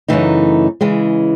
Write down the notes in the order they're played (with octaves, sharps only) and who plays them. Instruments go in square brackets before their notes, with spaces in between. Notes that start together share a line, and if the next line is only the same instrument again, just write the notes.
[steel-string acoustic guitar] F#2 C#3 E3 A3 D#4
C#3 E3 G#3